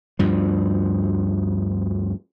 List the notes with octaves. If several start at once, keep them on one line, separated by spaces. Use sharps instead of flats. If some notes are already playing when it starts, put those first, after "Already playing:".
D2 G2 F3